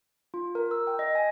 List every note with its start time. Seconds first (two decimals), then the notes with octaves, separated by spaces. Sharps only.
0.34 F4
0.55 A#4
0.71 E6
0.87 G5
0.99 D#5
1.15 G#5